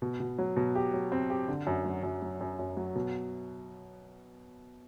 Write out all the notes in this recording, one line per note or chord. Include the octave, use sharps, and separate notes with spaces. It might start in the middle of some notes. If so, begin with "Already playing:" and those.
B2
B2
F#3
B2
G4
F#3
C4
G4
D3
F#2
F#3
F#2
F#3
F#2
F#2
F#3
B2